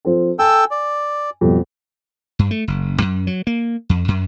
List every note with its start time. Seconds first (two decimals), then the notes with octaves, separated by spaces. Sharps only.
0.05 F3 C4 A4
0.39 A4 G5 G#5 E6
0.71 D5
1.41 F2 B2 G3
2.39 G2
2.51 A3
2.68 F#1
3.02 F#2
3.27 F#3
3.47 A#3
3.89 F2
4.08 F#2